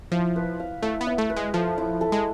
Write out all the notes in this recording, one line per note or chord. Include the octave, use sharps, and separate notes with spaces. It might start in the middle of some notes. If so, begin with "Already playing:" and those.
F3 E4
B4
F5
A3 E4
B3
E4
A3
B4
G#3
F3 A3
E4
A4
G#3